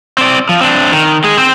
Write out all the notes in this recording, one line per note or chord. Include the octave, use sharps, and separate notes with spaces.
C4 D5
F3
C4 D4
D#3
G#3 G#4
C4 C5